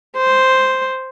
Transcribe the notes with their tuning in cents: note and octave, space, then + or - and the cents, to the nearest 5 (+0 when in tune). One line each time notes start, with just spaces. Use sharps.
C5 +0